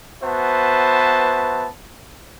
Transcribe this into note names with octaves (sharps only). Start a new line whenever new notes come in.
B3 F#4 B4 C5 E5 A5